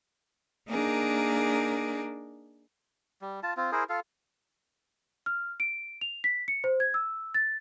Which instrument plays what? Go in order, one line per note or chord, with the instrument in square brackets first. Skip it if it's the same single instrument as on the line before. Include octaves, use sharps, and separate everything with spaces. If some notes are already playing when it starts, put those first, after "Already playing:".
[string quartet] A#3 D4 D#4 G#4 A#4
[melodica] G3
F4 A5
C4 F4
E4 G#4 A#4 C5
F4 A4 F5
[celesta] F6
D7
F7
B6
C#7
C5
G#6
E6
A6